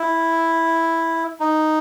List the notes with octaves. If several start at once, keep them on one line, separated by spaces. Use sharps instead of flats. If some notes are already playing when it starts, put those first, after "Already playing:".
Already playing: E4
D#4